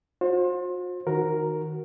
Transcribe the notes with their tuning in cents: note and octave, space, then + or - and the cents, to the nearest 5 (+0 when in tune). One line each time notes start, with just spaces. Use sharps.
F#4 -45 C5 +25
D#3 +0 F#4 +0 A#4 +0